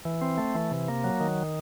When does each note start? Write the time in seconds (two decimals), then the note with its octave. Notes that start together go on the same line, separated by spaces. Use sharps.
0.05 E3
0.22 C4
0.38 A3
0.55 E3
0.71 C3
0.88 A#3
1.04 F#3
1.20 D#3